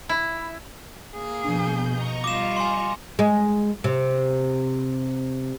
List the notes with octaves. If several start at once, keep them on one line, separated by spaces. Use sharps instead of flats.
E4
A#3 G#4
B2 F3 D4 G6
D#5 A#5 C#6
G3 F4 D6 E7
G#5 C6
G#3
C3